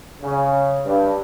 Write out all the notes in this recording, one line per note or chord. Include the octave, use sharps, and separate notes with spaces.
C#3
G2